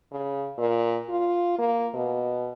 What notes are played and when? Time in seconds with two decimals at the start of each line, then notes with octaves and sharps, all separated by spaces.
0.12 C#3
0.58 A#2
1.09 F4
1.59 A#3
1.94 B2